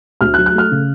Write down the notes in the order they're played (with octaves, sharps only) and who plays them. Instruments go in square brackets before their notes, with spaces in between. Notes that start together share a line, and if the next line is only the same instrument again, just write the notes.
[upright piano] D2 F6
F#6
F#3
F#6
A3 F6
C#3